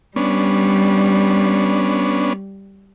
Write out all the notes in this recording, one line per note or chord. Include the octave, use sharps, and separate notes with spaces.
G3 B3 C#4 D4